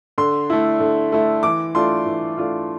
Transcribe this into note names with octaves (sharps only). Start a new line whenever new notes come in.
D3 C6
A3 E4
D3
A3 E4
E3 D6
A3 D4 F4 C6
E3
A3 D4 F4